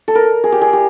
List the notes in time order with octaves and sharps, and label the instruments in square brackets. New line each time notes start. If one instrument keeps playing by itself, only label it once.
[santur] A4
A#4
G#4
G4
G#4
G4